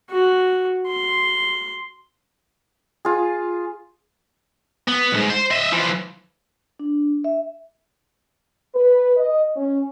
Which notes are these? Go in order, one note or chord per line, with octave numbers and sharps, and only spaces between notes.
F#4
C6
F4 G#4
B3
B1 G#2
C5
D#5 E5
E3 F3
D4
E5
B4
D#5
C#4